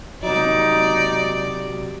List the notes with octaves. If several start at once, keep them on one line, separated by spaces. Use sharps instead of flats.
C3 F#3 D#4 D5